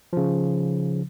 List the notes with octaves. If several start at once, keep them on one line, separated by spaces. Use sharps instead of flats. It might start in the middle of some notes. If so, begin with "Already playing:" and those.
C#3 F3